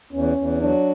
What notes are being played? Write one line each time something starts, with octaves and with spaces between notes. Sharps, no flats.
E2 C#4
E2
F#3 D4